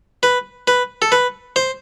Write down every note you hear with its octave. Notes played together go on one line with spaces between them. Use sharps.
B4
B4
A4
B4
C5